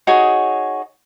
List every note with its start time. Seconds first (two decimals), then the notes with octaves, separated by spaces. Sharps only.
0.07 D#4 F#4 G#4 C#5